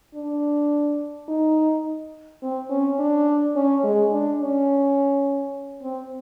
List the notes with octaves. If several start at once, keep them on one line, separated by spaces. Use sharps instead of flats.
D4
D#4
C4
C#4
D4
C#4
G#3
D4
C#4
C4